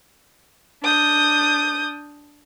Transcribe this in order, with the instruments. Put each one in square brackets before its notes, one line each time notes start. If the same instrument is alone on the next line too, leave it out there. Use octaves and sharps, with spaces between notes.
[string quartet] D4 D#6 G6